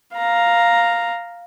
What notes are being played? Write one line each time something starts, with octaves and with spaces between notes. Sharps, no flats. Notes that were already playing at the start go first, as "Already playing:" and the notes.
F5 A#5